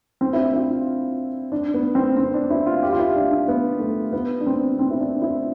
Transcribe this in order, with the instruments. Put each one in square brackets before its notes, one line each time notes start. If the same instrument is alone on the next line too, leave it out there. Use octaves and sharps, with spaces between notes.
[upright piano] C4
E4
D4
E4
F4
D4
B3
C4
C4
D4
E4
F4
G4
F4
E4
D4
D4
B3
A3
B3
D4
C4
C4
E4
D4
E4